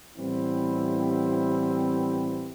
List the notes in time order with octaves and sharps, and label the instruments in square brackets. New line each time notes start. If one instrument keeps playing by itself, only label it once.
[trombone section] A2 E3 G3 B3 C4 E4